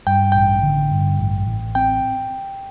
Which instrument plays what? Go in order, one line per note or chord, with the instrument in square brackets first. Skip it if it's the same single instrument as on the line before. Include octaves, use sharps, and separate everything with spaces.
[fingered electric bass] G2 [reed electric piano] G5
[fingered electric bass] A1 [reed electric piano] G5
[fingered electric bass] D3
G2
A1
A1
[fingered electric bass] C4 [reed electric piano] G5